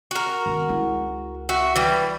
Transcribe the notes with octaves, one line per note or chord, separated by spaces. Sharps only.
F#4 A#4
D#3 B3
C#2 E4
F#4 E5
E3 G3